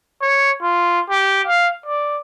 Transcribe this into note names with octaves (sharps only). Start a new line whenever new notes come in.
C#5
F4
G4
F5
D5